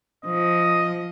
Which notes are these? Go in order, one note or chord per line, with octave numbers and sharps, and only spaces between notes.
F3 D#5